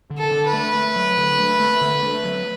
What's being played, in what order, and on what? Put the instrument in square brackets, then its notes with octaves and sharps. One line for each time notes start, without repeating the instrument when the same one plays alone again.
[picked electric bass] D3
[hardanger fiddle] A4
[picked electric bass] D3
[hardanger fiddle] B4
[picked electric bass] A3
A3
F#3
D3
A3
A3
D3
A3
F#3